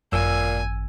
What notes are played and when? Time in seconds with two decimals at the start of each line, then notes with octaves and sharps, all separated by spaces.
0.12 G#1 F#2 A#2 G#5 E6